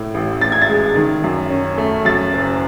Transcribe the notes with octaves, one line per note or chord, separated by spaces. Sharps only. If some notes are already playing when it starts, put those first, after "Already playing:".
Already playing: A2
A1
A1 A6
G#6
A6
G#3
D#3
F#2
C#4
A3
F#2 A6
F#1